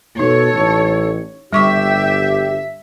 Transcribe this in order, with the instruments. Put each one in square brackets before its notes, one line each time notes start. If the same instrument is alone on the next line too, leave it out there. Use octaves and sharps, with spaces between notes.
[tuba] B2 [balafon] D#4 [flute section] A4 [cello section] C#5
[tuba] A1
[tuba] G1 [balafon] G3 C#6 D6 [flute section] G4 [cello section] E5